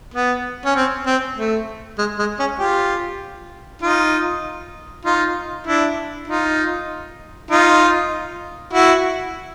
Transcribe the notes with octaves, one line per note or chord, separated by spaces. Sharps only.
B3
C#4
C4
C4
A3
G#3
G#3
C#4
F4 G4
D#4 F4
D#4 F4
D4 E4
D#4 F4
D#4 F4
E4 F#4